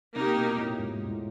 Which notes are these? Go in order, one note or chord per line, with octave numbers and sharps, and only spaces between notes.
C3 A#3 D#4 G4
B2
A#2
A2
G#2
G#2
G#2
A2